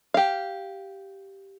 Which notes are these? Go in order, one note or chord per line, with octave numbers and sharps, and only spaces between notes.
G4 F5